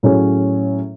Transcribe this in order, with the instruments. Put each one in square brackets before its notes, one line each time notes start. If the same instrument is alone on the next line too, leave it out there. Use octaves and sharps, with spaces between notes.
[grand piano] A2 F#3 C#4 G#4